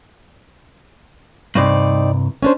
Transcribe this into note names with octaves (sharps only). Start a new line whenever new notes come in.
C2 G2 C4 D#4 D5
C#4 D4 C5